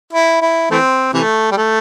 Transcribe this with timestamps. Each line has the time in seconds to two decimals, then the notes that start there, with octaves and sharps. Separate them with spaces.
0.13 E4
0.42 E4
0.71 E3 A3 C4
1.14 C3 E3 A3
1.51 G3
1.57 A3